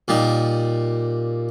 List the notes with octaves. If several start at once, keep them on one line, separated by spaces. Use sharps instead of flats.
A#2 G3 D#4